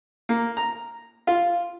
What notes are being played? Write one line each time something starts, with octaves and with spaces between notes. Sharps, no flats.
A#3
A#5
F4